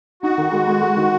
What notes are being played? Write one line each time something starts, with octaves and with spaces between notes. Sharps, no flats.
D#4 F#4
D#3
G#3
G#3
G#3
D#3